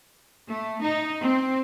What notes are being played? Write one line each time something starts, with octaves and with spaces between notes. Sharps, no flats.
A3
D#4
C4